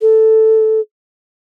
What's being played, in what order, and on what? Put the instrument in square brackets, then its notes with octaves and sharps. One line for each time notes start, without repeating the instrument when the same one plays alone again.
[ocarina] A4